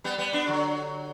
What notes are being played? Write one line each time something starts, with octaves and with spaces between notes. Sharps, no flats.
G3 B3
G3 B3
B3 D4
D3 F#3